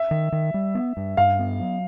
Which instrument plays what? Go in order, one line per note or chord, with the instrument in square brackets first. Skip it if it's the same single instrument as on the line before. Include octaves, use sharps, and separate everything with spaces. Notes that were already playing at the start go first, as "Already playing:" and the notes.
Already playing: [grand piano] E5
[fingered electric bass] D#3
D#3
G3
B3
G2
[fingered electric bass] G2 [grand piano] F5
[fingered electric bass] B3
F#3